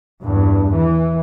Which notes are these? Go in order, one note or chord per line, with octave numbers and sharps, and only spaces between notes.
E2 G2
E3